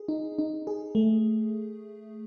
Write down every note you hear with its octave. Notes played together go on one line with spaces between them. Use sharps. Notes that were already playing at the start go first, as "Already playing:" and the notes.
Already playing: G#4
D#4
D#4
G#4
A3